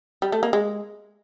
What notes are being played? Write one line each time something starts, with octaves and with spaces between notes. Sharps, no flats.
G3
A3
A#3
G#3